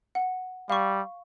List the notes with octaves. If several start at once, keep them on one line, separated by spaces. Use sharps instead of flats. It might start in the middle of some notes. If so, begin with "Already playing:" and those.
F#5
G3 F5 C#6